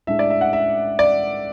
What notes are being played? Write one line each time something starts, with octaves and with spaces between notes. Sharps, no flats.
A2 G#3 D4 E5
D5
E5
F#5
E5
D5